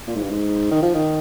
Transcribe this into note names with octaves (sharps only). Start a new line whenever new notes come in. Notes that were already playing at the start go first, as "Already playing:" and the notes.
A#2
G#2
G2
G#2
D#3
F3
D#3